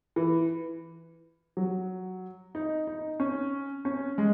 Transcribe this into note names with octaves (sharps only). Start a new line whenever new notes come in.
E3
F#3
D#4
D#4
C#4
C#4
G#3